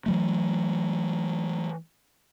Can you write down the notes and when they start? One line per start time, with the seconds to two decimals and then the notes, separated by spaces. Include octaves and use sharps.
0.06 E3 F#3 A3